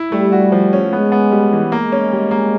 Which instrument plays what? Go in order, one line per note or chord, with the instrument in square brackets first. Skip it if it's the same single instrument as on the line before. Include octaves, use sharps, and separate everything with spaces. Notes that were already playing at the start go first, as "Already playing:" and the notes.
Already playing: [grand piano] E4
[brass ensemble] G3 [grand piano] A3
[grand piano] F#4
F3
C#4
[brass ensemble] G#3 [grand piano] B3
[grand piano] B3
G3
E3
[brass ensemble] G#3 [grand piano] A#3
[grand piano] C#4
G3
A#3